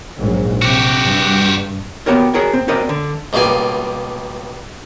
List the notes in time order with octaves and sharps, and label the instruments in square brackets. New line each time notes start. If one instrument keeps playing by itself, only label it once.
[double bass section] A#1 G#2 F#3
[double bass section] C3 [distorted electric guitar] F#4 G4
[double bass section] G2
[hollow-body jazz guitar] B3 F#4 G4 A#4 C#5
F#4 G#4 A#4 C#5
C4
C4 F#4 A#4 D5 D#5
D3
[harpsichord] C#2 B2 G3 A#3 G#5